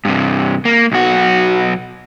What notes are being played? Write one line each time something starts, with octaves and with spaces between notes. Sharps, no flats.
G2 C3
A#3
B1 F#4